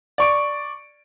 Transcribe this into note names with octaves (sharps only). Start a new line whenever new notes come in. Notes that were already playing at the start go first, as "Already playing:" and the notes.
D5 C#6 D7